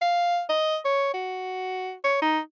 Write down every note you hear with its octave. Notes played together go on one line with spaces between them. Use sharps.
F5
D#5
C#5
F#4
C#5
D#4